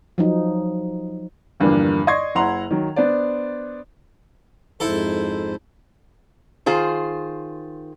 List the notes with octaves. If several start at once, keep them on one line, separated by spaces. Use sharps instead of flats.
F3 F#3 D#4
E2 G2 D3 F3 A#3
D5 D#5 C6 C#6 G#6 C7
F#1 E4 F#5 A#5 C6 F7
D#3 F#3
B3 D4 C5 D5
F2 G#2 E4 A4 C5
D#3 F4 G#4 C5